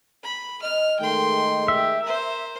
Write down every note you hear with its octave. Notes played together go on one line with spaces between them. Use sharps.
B5
D#5 F6
D#3 G#3 A3 G5 C6
G4 E5
A#4 C5